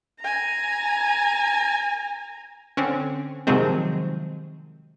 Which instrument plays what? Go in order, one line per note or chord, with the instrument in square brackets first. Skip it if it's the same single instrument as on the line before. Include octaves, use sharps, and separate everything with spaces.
[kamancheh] G#5 A#5
[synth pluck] D3 C4 C#4
C3 D#3 F3 F#3 G#3 C4